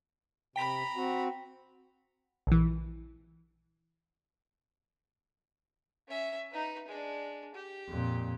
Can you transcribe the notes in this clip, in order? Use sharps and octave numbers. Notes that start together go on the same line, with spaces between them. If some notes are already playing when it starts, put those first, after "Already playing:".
C3 G5 A#5 B5 B6
C4 F#4
A#1 E3
C#4 E5
D#4 B4
G#3 D4
G4
F2 A#2